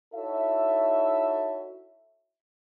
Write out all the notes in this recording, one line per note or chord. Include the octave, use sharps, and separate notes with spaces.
D#4 E4 F#4 A4 C#5 E5